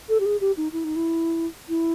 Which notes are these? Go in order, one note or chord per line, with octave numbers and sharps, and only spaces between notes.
A4
G4
G#4
G4
D#4
E4
D#4
E4
E4